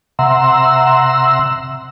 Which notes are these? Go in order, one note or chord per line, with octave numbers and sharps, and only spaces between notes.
C3 E5 F#5 A#5 C6 E6